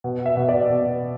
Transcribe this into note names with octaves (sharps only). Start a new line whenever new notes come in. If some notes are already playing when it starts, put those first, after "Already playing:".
B2
E5
B2
D5
B2